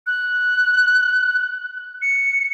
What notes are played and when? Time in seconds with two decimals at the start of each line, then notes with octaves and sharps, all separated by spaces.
0.07 F#6
2.02 C#7